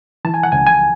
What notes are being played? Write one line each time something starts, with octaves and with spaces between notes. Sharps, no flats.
E3 A5
G#5
F#5
C#2 G#5
G#5